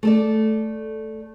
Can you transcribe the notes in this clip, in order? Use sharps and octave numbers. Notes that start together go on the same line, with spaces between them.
A3 A4 D5